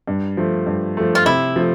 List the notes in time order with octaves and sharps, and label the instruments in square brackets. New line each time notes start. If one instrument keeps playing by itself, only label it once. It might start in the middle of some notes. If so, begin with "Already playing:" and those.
[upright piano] G2
F3 A3
G2
F3 A3
[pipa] F4
[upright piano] C3 [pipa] E4
[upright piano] F3 A3